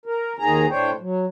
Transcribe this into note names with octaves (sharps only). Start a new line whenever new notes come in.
A#4
D#2 D#3 G#4 A#5
A2 D4 C5 C#5 G5
F#3